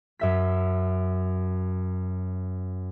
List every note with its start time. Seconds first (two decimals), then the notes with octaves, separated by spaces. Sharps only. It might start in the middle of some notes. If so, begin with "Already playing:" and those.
0.19 F#2 E5 B6